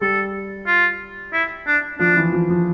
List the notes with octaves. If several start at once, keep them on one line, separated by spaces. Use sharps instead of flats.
G3 A4
F4
E4
D4
F3 D4
E3
F3
F3